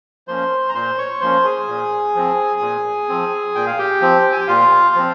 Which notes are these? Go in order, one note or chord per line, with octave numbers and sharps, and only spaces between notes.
F3 A#3 C#4 C5 C6
A#5
A#2 C5 C6
C#5 C#6
F3 A#3 C#4 C5 C6
G#4 G#5
A#2
F3 C4
A#2
F3 C4
A#2 G5
F5
G4 G5
F3 C4
G#5
G5
A#2 F4 F5
F3 C4